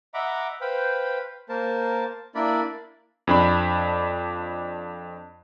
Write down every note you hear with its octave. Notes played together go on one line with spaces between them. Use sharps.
D#5 E5 F#5 A#5 B5 D6
B4 C5 F5 G5 B5
A#3 A#4 C5 A5
A#3 D4 E4 A#4 D5 B5
F2 D4 B5